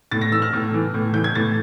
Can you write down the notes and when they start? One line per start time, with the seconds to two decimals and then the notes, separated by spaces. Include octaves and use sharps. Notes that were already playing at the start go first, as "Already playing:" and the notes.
0.11 A2 A6
0.21 A#6
0.31 E3 E6
0.42 F6
0.53 A2
0.74 E3
0.94 A2
1.14 E3 G6
1.24 G#6
1.35 A2 A6